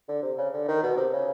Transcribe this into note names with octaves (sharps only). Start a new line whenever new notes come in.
D3
C3
C#3
D3
D#3
B2
C3
C#3